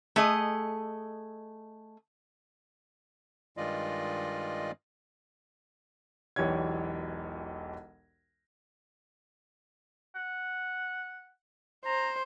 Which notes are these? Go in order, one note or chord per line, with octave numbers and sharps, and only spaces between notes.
A3 G#4 D#5
G2 D#3 G#3 F4 D5 D#5
E1 B1 E3 G4 C#5 G#6
F#5
C5 A#5